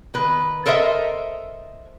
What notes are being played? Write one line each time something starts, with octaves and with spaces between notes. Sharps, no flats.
D#3 B4
A4 A#4 C5 D#5 E5